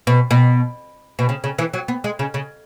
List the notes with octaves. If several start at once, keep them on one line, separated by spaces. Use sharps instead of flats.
B2
B2
B2
C#3
C#3
E3
F#3
B3
G#3
C#3
C#3